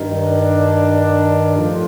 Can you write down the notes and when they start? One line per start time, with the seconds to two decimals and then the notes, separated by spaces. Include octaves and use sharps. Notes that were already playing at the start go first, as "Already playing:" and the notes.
Already playing: G2 D#3
0.23 D4
1.55 A2 F3